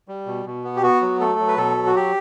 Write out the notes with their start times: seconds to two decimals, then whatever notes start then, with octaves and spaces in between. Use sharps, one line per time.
0.08 G3
0.26 B2
0.46 B2
0.64 B3
0.76 G4
0.83 B3 F#4
1.02 F#3
1.20 A3 A4
1.40 F#3
1.48 B4
1.57 B2 A4
1.77 F#3
1.86 F#4
1.96 G4